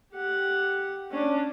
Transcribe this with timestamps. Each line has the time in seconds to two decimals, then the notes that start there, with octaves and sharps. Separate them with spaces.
0.13 G4 F#5
1.11 C#4 D4